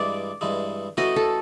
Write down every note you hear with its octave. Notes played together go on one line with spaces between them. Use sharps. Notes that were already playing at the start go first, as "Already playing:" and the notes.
Already playing: G2 E3 G#3 D5
G2 E3 G#3
E3 A3 C#4 F#4 D#5
A4